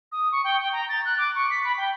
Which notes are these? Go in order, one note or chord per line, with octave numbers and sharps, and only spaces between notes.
D#6
C#6
G5
G5
A#5
A6
F#6
D6
C#6
B6
B5
G5